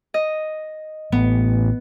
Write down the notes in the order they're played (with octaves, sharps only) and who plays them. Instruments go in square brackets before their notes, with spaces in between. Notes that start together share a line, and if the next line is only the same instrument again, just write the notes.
[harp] D#5
[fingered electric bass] A1 [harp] B3